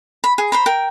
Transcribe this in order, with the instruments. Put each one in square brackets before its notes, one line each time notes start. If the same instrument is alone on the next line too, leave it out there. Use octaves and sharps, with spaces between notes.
[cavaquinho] B5
G#4
C5 A#5 B5
A#4 G5